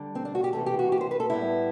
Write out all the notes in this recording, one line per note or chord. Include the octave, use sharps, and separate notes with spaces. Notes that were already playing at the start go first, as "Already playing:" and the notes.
Already playing: D3 G3
C4
D4
F#4
G4
C3 E3 A3 C4 A4
G4
F#4
G4
C5
B4
A4
A2 G3 B3 E4